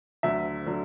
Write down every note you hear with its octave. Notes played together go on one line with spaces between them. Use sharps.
D2 D3 F#3 E5
D3 F#3